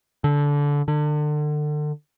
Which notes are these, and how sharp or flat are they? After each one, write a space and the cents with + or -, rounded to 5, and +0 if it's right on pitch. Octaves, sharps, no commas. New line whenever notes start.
D3 -20
D3 +30